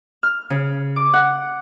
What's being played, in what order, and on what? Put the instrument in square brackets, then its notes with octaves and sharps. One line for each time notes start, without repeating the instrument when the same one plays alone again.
[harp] F6
C#3
D6
F#5